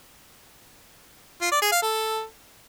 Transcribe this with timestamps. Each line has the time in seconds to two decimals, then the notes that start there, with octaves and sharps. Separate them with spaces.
1.41 F4
1.52 D5
1.62 G#4
1.72 F5
1.82 A4